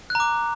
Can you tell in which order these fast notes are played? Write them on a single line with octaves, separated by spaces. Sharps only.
F#6 A#5 D6